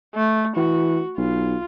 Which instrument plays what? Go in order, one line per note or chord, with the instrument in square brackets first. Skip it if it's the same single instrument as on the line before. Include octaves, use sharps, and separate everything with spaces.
[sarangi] A3
[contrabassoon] E3 [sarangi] F#4
[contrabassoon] B1 [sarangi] F4